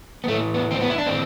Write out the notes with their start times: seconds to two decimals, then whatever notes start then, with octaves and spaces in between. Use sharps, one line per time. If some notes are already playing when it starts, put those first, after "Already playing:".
0.24 B3
0.28 A2 A3
0.32 E3
0.54 B3
0.71 C4
0.81 B3
0.90 E4
0.98 D4
1.06 A2 E3 C4